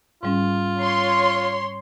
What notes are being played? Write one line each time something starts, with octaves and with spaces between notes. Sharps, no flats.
G#2 G3 C#4 F4
C#5 C6